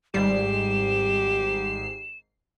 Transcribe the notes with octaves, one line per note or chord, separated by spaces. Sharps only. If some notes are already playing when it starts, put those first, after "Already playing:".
G#1 G#2 G3 G4 C7 E7